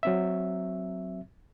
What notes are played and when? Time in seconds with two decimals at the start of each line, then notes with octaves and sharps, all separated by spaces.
0.03 F#3 C4 E5